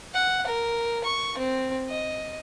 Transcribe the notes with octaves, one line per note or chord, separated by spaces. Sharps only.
F#5
A#4
C#6
C4
D#5